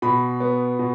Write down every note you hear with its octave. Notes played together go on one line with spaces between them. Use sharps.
B2 B5
B3
B2